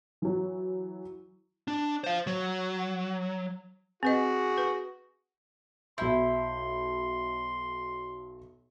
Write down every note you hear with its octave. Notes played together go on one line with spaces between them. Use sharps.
E3 F#3
D4
C5 F5
F#3
C4 F#4 G#4 B4 D#5
B4
B1 E4 B5 C6 G6